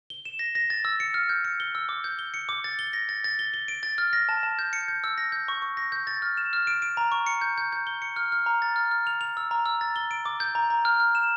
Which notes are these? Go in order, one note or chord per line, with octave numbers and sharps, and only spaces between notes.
G7
E7
A#6
A#6
A6
E6
C#7
F6
G6
C#7
G7
E6
D6
G6
G7
C#7
D6
A6
G7
A#6
A6
A6
G7
G7
D7
A6
F6
A#6
A5
A5
G6
C#7
G6
E6
A#6
G6
C#6
C#6
A#6
G6
A6
F6
E7
F6
D7
D7
A#5
C#6
C#7
G6
G6
G6
G7
C#7
F6
F6
A#5
A6
F6
F6
F7
F7
E6
A#5
E6
A6
G7
D7
D6
G6
A#5
A#5
F6
F6
E7